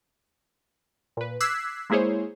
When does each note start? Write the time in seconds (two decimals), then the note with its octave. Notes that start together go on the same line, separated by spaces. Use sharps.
1.17 A#2 B4
1.40 D6 E6 F#6 G#6 B6 C7
1.90 G#3 A#3 E4 G#4 C5 C#5